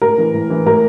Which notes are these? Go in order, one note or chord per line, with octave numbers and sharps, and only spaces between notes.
A2 A#4
E3
A2
E3
A2 A#4